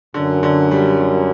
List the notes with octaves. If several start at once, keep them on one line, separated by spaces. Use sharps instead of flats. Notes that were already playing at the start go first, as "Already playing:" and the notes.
F#2 D3
D3
G3
G3